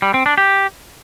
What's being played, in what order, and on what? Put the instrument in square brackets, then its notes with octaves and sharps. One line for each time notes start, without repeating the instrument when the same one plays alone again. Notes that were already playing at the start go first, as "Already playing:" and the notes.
[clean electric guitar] G3
C4
D4
G4